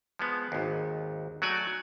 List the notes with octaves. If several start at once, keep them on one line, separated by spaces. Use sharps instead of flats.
F3 G#3 B3
G#1 D#2
F#3 A3 F#4 D5 G#5